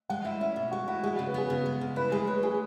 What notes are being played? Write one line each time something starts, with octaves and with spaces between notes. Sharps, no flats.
G#3 F#5
E4 E5
C#4 E5
B2
G#3 F#4
E4 F#4
G#3 G#4
F#4
C#3
B4
B3 G#4
C#3
G#3
C#3
E4 B4
G#3 G#4
B4 C#5
G#3 G#4